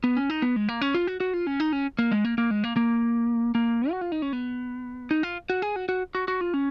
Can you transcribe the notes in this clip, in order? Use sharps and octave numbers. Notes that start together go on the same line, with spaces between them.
B3
C#4
D#4
B3
G#3
A#3
C#4
F4
F#4
F#4
F4
C#4
D#4
C#4
A#3
G#3
A#3
A#3
G#3
A#3
A#3
A#3
F#4
F4
D#4
C#4
B3
D#4
F4
F#4
G#4
F#4
F#4
F#4
F#4
F4
C#4